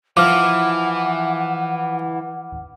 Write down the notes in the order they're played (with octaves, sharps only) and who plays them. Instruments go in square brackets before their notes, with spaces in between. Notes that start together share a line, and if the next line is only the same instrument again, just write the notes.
[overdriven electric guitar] E3 [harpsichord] F3 [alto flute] F#5 [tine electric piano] D6 F6